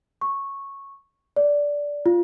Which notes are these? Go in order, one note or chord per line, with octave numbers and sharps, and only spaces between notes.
C#6
D5
F4